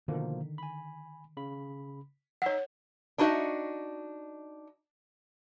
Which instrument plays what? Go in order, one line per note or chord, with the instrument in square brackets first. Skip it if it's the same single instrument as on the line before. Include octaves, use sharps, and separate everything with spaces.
[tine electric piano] B2 F3 A#3 [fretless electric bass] D3 D#3
[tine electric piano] G#5 B5
C#3 B5
[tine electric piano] D#4 E6 B6 [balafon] C#5 F#5
[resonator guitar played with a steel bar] D4 D#4 F#4 C5 D#5 E5